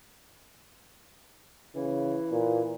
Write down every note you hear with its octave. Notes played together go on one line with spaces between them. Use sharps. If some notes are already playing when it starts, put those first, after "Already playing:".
C#3 E3
A#2